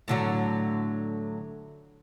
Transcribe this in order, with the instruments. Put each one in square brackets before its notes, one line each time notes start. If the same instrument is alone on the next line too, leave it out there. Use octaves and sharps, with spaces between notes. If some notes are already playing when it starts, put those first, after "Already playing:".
[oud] A2 D3 F#3